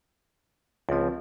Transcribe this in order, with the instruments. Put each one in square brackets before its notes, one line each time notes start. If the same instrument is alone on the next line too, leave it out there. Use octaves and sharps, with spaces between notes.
[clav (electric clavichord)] C#2 F3 [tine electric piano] C4 F4